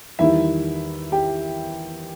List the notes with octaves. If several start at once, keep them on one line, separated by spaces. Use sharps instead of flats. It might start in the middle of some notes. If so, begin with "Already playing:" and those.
E2 D#3 G3 E4 E5
G4 G5